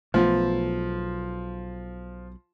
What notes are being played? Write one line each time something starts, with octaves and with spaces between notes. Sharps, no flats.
B1 F3 A3 B3